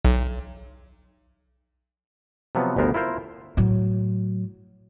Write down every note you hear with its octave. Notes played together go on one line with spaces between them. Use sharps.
B1
C3 F3 F#3 B3
G1 D2 B3 A#4 C5
E4 F4 A#4 C5
A2 F#3